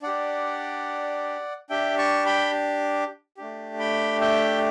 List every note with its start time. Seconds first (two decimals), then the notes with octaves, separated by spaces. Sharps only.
0.02 D4 G4 D5 F#5
1.70 D4 G4 E5 G5
1.98 A5 C#6
2.26 G5 B5
3.37 A3 D4 G4
3.79 G5 B5
4.21 E5 G5